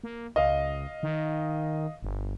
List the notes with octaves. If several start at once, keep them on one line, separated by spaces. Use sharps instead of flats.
A#3
C#2 D#5 F5
D#3
G1